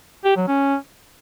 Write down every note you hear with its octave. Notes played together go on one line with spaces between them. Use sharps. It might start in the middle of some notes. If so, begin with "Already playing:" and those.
G4
F#3
C#4